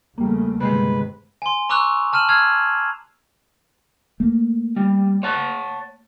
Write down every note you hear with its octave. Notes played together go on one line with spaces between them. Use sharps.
E2 C#3 G3 A3 A#3
G1 C3 D#3 G#3 B4
G#5 C6
A#5 C#6 D6 E6 F#6 F7
A5 F6 D#7 E7 F#7
E6 F6 G#6 C7 F7
A3 A#3
G3
C#5 F#5 A5